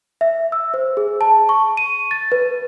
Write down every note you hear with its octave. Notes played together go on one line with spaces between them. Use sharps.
E5
E6
C5
G#4
A5
C#6
D#7
A6
B4